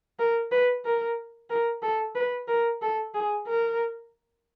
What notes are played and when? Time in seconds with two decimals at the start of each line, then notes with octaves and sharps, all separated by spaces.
0.19 A#4
0.51 B4
0.85 A#4
1.50 A#4
1.83 A4
2.15 B4
2.48 A#4
2.82 A4
3.14 G#4
3.47 A#4